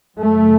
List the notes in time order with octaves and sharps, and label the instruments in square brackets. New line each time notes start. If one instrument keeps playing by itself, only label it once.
[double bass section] F#2 C#3 A3